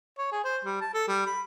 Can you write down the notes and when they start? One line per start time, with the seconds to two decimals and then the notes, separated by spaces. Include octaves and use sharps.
0.18 C#5
0.32 G#4
0.45 C5
0.65 G3
0.81 A5
0.94 A4
1.08 G3
1.27 B5